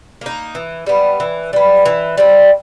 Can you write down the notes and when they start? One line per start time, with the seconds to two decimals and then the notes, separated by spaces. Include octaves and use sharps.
0.21 A#3 D#4
0.55 E3
0.87 G3 B3
1.20 E3
1.53 G3 B3
1.86 E3
2.18 G3 C4